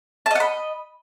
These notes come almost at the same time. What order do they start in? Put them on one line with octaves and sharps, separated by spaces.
A5 D#5 F#5 B5